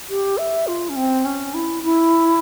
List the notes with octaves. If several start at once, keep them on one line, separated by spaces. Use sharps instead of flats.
G4
E5
F4
C#4
C4
C#4
E4
E4